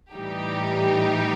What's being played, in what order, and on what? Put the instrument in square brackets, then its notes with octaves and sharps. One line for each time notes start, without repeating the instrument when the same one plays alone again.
[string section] A2 E3 G3 D#4 G4